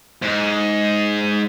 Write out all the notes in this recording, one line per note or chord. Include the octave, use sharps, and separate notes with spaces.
G#2